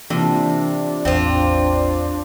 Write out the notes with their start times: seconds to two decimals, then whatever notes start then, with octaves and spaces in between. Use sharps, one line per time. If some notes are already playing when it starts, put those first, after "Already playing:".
0.10 C3 E3 A#3 D4 F4
1.05 A1 E2 C4 F4 F5